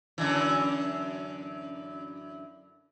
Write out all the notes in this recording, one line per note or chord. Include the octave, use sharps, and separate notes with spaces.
F#2 D3 E3